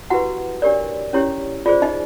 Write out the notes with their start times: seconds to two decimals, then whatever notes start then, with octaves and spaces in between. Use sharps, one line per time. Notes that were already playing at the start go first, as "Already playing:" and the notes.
0.10 E4 F#4 G4 B4 F#5
0.62 D4 G4 A#4 C#5 D5
1.13 C#4 E4 G4 C#5
1.66 F4 G#4 C5 D5
1.82 D#4 D#5